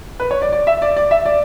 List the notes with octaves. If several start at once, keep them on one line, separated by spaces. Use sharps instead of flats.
B4
C#5
D5
D5
E5
D5
D5
E5
D5